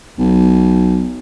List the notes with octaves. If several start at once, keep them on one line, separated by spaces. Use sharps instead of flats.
B1